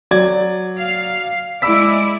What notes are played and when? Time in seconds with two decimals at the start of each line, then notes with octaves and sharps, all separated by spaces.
0.11 F#3 D5 G#6
0.78 F5
1.62 G#3 E4 D5 B5 E6 B6